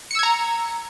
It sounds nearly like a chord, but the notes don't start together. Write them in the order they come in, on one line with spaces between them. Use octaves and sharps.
C#7 E6 G#6 A#5